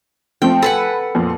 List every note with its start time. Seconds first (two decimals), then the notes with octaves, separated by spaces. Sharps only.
0.42 F3 A3 C4 G5
0.62 A4 B4 F#5 G#5 B5
1.15 F2 A#2 F3